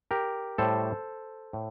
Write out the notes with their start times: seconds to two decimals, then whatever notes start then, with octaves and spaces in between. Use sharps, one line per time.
0.11 G4 A#4
0.58 A2 G3 A4 C5
1.53 A2